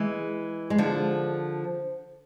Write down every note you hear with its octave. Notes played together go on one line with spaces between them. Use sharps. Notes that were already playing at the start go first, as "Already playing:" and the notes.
Already playing: E3 G#3
G#3
D3 F3